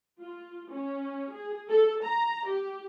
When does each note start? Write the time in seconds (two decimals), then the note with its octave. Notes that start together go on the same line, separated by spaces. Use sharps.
0.21 F4
0.71 C#4
1.33 G#4
1.69 A4
2.04 A#5
2.48 G4